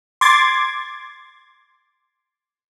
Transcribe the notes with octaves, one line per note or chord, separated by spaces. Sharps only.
C6 D6 G#6 A6